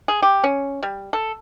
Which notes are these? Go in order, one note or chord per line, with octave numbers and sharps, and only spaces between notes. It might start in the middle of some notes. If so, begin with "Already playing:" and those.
G#4
G4
C#4
G3
A4